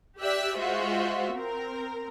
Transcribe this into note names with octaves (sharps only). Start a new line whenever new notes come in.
G4 D5 E5 E6 F#6
G#3 F4 F#4 C5 E5
C4 A#4